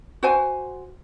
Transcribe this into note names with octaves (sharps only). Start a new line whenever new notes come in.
F#4 C5 G#5